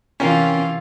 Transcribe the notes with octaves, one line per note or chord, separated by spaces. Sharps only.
C3 E3 C#4 F4 A#4 G5